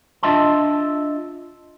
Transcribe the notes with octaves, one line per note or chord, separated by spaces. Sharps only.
D4 F4 D#5 E5 A5 C6